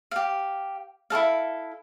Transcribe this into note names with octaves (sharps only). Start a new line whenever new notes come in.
G4 F5
E4 F4 A4 F5